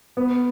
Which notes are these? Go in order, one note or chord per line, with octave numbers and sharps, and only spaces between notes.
B3